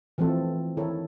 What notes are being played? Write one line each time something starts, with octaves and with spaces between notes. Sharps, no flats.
E3 F3 A3 C4 A4
D#3 E4 A4 A#4 C#5